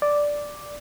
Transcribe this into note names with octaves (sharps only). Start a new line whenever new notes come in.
D5